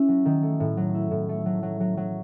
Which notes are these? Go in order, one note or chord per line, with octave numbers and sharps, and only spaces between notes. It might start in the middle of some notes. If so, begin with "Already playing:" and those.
Already playing: C#4 E4
F#3
D#3
A3
A2
F#3
E4
A2
A3
F#3
F#3
F#3
F#3